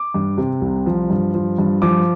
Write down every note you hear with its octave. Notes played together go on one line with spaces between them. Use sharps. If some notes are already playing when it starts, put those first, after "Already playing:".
Already playing: D6
G2
C3
C2
F3
G2
F3
G2
F3 D6